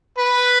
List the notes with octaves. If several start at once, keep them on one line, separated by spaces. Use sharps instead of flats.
B4